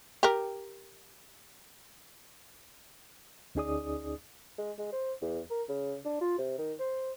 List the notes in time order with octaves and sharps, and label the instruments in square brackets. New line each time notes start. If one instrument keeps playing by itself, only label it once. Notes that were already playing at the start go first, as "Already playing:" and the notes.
[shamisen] G4 A#4
[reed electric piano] D2 C#4 D#4 G#4 D5 D#6
[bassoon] G#3
G#3
C5
E2
A#4
C#3
D4
F4
C3
D#3
C5